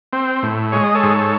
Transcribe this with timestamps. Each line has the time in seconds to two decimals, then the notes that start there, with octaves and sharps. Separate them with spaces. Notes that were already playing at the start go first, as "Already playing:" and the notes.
0.13 C4
0.43 A2
0.72 G#3 C#5
0.84 D#5
0.95 A4 C#5
1.03 G#2